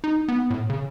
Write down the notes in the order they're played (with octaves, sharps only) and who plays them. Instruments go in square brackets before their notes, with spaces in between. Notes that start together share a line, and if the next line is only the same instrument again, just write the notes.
[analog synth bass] D#4
B3
A2
C#3